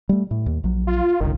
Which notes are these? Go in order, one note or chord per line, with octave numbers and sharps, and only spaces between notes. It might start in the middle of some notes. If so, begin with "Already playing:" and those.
G3 A3
A2
D#2
A#1 F#3
F4
G1 C#2 D#3